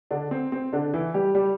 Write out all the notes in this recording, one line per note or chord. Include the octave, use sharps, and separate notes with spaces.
D3 D4
C4
C4
D3 D4
E3 E4
G3 G4
G3 G4